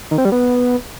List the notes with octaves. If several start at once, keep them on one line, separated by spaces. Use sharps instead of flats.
D#3
C4
G3
B3